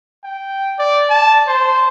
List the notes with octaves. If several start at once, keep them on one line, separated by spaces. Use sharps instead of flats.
G5
D5
A5
C5